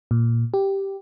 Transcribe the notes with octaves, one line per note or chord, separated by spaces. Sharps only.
A#2
G4